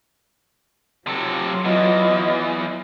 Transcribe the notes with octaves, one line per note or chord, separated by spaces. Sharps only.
C3 F#3 F4 A4
E2 E3 D#5